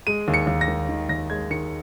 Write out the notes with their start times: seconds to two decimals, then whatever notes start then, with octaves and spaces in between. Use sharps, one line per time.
0.07 G#3 D#7
0.28 D#2
0.34 C#7
0.47 D#2
0.61 A#6
0.68 D#3
0.89 D#3
1.09 D#2 A#6
1.30 G#3 G#6
1.51 D#3 C#7